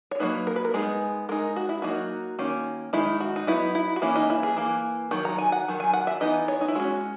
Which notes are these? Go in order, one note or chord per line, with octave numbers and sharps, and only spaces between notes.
C#5
F#3 A#3 D#4 B4
A#4
B4
A#4
G#3 B3 D#4 G#4
G#3 D#4 A#4
F#4
E4
F#3 A#3 D#4 F#4
D#3 A#3 C#4
D#3 G#3 D#4 E4
F#4
D#4
F#3 B3 D#4 E4
E4
F#4
E3 A#3 C#4 E4
D#4
E4
G#4
E3 A#3
D#3 F#3
A#5
G#5
F#5
D#3 F#3
G#5
F#5
E5
E3 B3 D#4 D#5
C#5
D#4
E4
G#3 C#4 F#4